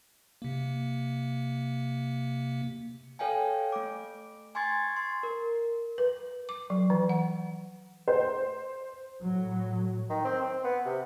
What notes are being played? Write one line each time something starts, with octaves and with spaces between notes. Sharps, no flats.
C3 A#3
A4 C#5 F5 G5 G#5
A3 D6
G#5 C6 C#6 G#6 A6
C6
A#4
B4
D6
F#3
E3
F#5
C5
A2 F#3
D#3
C4
C4
B3
C3